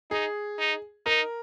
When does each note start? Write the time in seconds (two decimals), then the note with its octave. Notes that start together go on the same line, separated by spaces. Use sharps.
0.11 D#4 G#4
0.59 D#4
1.06 D#4 A#4